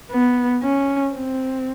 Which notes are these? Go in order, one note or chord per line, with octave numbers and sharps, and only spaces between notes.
B3
C#4
C4